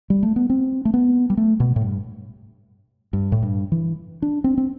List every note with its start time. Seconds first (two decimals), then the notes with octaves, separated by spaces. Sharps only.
0.10 G3
0.23 A3
0.36 B3
0.50 C4
0.85 A3
0.94 B3
1.30 G3
1.37 A3
1.60 B2
1.76 A2
1.81 G2
3.13 G2
3.32 A2
3.43 G2
3.72 E3
4.22 D4
4.44 C4
4.58 C4